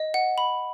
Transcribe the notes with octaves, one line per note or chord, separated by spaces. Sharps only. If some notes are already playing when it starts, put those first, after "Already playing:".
Already playing: D#5
F#5
B5